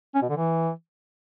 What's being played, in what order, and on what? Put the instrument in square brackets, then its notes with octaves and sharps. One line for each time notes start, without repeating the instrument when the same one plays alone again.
[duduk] C#4
B2
D3
E3